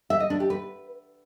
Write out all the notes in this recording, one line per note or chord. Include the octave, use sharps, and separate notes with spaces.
E5
D#5
D4
G4
B4